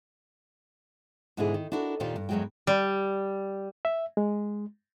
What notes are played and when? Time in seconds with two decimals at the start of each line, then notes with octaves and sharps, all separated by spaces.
1.37 G#2 B2 D3 E3 E4 G#4
1.54 D#3
1.72 D4 E4 F#4 A4 A#4
2.00 D#2 A#2 D#3 F4 G4 D5
2.16 G2
2.29 E2 G2 F#3 G#3 F#4 G5
2.67 G3
3.85 E5
4.17 G#3